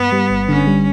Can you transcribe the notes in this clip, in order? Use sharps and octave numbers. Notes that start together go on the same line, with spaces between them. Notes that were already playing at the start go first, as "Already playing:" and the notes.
Already playing: G2 B3
G3
G1
D3 C#4
G3